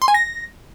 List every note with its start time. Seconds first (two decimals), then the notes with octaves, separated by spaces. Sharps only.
0.02 C6
0.08 G#5
0.14 A#6